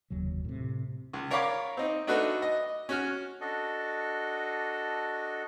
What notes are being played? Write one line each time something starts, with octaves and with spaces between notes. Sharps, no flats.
F1 D#2 C#3 F#3
A2 C3
C#2
A#4 C#5 D5 F5 B5 D6
C4 D#4
A3 D4 D#4 F#4 A4 B4
D#5
C#4 F#4 F6
D4 F#4 A4 D#5